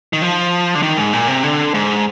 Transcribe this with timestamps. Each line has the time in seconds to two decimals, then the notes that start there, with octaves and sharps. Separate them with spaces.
0.13 D#3
0.22 F3
0.75 D3
0.83 D#3
0.97 G#2
1.13 A#2
1.28 C3
1.43 D3
1.74 G#2